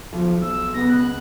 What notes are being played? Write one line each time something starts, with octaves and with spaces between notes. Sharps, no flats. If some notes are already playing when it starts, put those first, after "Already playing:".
B1 F3
E6
C#2 B3 A#6
F#6